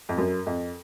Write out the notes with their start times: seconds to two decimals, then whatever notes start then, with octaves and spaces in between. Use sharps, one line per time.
0.09 F2
0.18 F#2
0.46 F2